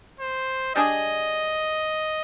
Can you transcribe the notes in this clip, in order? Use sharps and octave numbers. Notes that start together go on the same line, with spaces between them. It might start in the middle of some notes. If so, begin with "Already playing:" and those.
C5
G3 D4 G#4 D#5